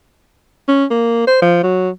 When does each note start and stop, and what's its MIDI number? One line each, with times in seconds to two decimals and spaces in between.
0.68 0.85 61
0.90 1.26 58
1.27 1.42 72
1.42 1.58 53
1.63 1.90 54